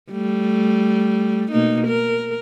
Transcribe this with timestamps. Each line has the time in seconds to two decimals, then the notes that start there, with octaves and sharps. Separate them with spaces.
0.12 G3 A3
1.51 B2 A#3 D#4
1.87 A#4